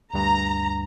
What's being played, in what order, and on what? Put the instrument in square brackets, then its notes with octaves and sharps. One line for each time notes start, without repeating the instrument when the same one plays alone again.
[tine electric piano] D2 G2 [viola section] A#5